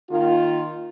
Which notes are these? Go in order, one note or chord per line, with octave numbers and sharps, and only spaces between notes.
D#3 A#3 F4